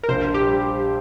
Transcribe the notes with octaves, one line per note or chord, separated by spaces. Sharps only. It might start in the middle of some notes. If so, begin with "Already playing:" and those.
A#4
A#1 C5
G4
G3